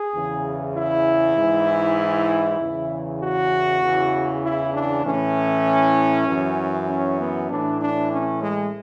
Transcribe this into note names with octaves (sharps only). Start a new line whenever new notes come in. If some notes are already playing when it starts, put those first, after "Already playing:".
Already playing: G#4
E2 C#3 E3
E4
G#2 E3
E2 C#3 E3
F#4
E2 C#3 E3
E4
D4
A2 E3 C#4
F#2 E3
C#4
B3
A2 E3 D4
D4
C#4
G#3